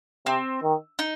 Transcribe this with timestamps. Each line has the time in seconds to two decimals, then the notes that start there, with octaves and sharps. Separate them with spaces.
0.26 C3 C4
0.63 D#3
0.99 D#4